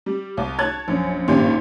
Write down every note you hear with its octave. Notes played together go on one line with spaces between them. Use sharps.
G3
C2
C#5 A5 F#6 G#6 A6
A#1 F#2
G#1 G2 A#2 C#3 G4